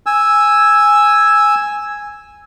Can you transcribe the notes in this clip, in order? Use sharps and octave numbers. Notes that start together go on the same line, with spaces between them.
G#5 E6